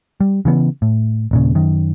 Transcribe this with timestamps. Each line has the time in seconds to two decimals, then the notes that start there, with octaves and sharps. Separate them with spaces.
0.20 G3
0.45 C#3 E3 B3
0.82 A2
1.31 D#1 A#2 C#3
1.55 F#2 D#3